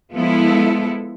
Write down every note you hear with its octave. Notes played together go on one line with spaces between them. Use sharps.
F3 G#3 B3 E4 A4